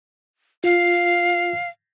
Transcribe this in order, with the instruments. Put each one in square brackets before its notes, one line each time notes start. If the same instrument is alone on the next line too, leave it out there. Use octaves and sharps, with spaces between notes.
[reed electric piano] F4 [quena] F5